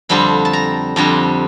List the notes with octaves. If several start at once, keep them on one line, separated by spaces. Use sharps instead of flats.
F2 D3 G3 C4 B5
A5
A#5
F2 D3 G3 C4 A#5